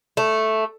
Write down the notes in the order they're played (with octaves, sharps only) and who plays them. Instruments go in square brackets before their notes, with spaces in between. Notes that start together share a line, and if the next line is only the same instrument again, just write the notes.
[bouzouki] A3